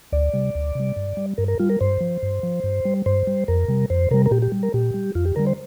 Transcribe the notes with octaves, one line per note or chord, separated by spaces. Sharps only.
D2 D5
C3 G3
D2
C3 G3
G2
G3
G2 A#4
A#4
G3 F4
A#4
G2 C5
F3
G2
F3
G2
G3
G2 C5
G3
F2 A#4
C3 G3
F2 C5
C3 G3 A#4
A#4
A#2 G4
G4
G3
A#4
A#2 G4
G3
F2 F4
G4
D3 G3 A#4
C5